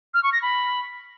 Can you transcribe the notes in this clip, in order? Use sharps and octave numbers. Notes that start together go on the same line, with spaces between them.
F6
C#6
A#6
B5